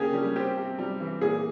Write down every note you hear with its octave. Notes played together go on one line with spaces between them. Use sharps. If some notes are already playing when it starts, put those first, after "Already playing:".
Already playing: C#3 A#3 C#4 G4 G#4
G3
C4 G4
C3
G3
E3
A#2 G#4